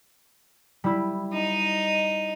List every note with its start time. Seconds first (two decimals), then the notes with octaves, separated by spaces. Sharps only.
0.84 G3 E4
1.33 D#4 D#5